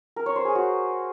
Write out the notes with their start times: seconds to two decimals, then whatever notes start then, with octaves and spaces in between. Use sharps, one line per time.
0.16 A#4
0.26 C#5
0.36 C5
0.45 G#4
0.55 F#4